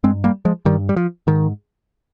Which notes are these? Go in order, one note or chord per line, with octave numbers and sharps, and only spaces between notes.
G2 G#3 C4
G3 A#3
F3 G#3
G2 D#3 G3
G3
F3
G#2 D#3